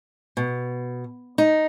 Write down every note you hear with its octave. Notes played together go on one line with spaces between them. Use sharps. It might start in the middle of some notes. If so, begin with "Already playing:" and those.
B2
D#4